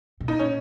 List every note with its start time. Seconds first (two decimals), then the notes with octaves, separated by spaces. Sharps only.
0.20 B2
0.28 A#2 D#4
0.39 C#4